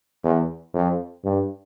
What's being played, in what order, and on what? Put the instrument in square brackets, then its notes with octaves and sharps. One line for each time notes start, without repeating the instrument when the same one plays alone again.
[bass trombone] E2
F2
G2